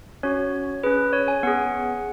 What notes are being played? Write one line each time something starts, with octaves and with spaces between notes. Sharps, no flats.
C#4 F#4 C#5
C#4 G#4 B4
C#5
G#5
B3 G#4 F#5